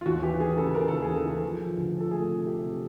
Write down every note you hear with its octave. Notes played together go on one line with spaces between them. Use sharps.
F4
D#2 F#4
E3 G4
E3 G#4
C#3 A4
C#3 A#4
D#2 A4
G#4
C#3
A4
E3
F3
F3
D2
F3
A4
A3 G#4
C3
C3 G4
C3